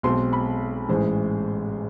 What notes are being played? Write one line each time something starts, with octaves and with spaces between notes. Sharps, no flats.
B1 B2 G#3 C4 C6
B5
A1 G#2 E3 G#3 C5